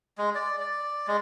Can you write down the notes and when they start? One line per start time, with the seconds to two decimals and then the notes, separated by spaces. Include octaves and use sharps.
0.18 G#3
0.35 D5
0.60 D5
1.07 G#3